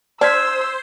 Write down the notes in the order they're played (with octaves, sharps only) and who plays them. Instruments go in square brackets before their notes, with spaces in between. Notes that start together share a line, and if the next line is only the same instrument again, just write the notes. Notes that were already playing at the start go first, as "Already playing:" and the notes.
[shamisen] D4 [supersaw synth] C5 [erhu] E6 [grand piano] F6 G#6 B6